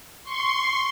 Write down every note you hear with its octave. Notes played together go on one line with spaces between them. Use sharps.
C6 C#6